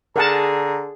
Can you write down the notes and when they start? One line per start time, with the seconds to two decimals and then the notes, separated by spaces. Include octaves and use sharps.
0.16 D3 G#4 A#4 F#5 A5 A#5